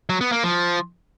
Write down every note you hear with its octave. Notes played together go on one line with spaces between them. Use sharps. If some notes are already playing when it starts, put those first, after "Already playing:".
F#3
B3
A#3
F3